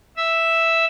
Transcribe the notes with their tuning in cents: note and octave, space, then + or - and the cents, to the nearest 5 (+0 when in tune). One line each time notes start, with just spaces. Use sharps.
E5 +0 E6 +0